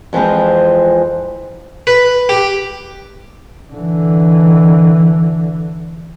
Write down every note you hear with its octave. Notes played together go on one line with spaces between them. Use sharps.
F2 E3 F3 G#3 C4
B4
G4
D3 E3